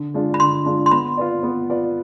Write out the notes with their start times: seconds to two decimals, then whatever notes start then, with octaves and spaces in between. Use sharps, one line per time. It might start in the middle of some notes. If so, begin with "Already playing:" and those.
Already playing: D3
0.14 G#3 D4 F4
0.34 B5
0.40 D3 C6
0.66 G#3 D4 F4
0.86 C6
0.91 B3 B5
1.17 F4 B4 D5
1.43 B3
1.70 F4 B4 D5